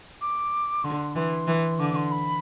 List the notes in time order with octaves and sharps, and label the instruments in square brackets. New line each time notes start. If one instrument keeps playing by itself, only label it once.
[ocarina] D6
[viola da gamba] D3 [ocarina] C6
[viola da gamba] E3 [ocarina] C6
[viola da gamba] E3
[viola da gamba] D3 [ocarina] D6
[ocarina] D6
C6
B5